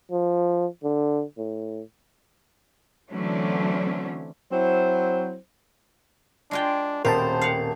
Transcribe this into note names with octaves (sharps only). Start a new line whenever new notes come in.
F3
D3
A2
D3 E3 F#3 A3 C4 C#4
F#3 C4 E4 C5
G#3 D4 F4 G5
D#1 B2 C4 A#4 C5 G5 A5
F5 F#5